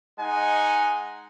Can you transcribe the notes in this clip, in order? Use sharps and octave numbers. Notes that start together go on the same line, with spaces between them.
G#3 D#4 F#5 G#5